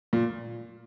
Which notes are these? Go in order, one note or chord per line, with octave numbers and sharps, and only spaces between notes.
A#2